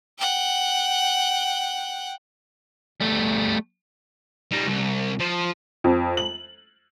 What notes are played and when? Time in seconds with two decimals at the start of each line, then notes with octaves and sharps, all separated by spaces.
0.18 F#5 G5
3.01 G3 A3
4.51 G3 D#4
4.67 C2
5.20 F3 C5
5.84 F2
6.17 F#7